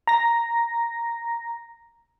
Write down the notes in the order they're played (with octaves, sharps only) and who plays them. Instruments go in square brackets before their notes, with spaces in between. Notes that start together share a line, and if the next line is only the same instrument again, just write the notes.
[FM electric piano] A#5 A#6